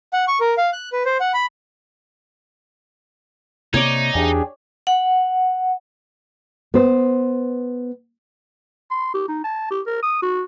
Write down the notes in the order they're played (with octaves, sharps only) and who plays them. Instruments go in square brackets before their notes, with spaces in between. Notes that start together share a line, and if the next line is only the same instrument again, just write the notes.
[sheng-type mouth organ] F#5
C#6
A#4
F5
F#6
B4
C5
F#5
B5
[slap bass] C3 A#3 [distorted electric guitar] D#4 [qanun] C#5 D5
[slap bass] E2 [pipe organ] D4 G4 G#4
[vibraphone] F#5
[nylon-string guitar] B3 C5
[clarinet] C6
G4
D#4
A5
G4
A#4
D#6
F#4